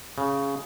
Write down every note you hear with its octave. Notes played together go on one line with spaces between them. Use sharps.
C#3